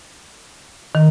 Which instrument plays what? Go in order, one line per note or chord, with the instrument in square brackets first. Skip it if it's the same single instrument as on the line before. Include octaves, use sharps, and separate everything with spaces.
[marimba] D#3